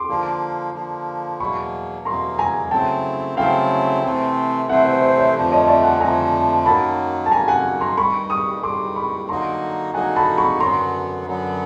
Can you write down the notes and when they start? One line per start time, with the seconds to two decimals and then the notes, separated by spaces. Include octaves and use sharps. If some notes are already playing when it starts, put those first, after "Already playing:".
Already playing: C6 D6
0.09 D3 F3 A#3
0.74 D3 F3 A#3
1.40 E2 B2 F#3 A#3 B5 C#6
2.05 E2 B2 F#3 A#3 A#5 C6
2.39 G#5 A#5
2.71 C#3 F#3 A3 C4 E4 G5 A5
3.37 C#3 F#3 A3 C4 E4 F5 G5
4.03 C3 E3 A3 C4
4.69 C3 E3 A3 C4 E5 F#5
4.85 C5
5.02 C5
5.18 B4 C#5
5.34 F2 D3 F3 A3
5.51 C#5 D#5
5.67 D5 E5
5.84 F#5 G#5
6.00 F2 D3 F3 A3 G#5 A#5
6.66 F#2 D#3 F#3 A#3 A5 B5
7.26 A5
7.31 F#2 D#3 F#3 A#3 G#5 A#5
7.48 F#5 G#5
7.81 A#5 C6
7.97 G2 D#3 G3 B5 C#6
8.30 C#6 D#6
8.63 G2 D#3 G3 C6 D6
8.96 B5 C#6
9.29 D3 F#3 A#3 D#4 F#4 A#5 C6
9.94 D3 F#3 A#3 D#4 F#4 F#5 G#5
10.16 A5 B5
10.38 B5 C#6
10.60 F#2 D3 F#3 B3 A#5 C6
11.26 F#2 D3 F#3 B3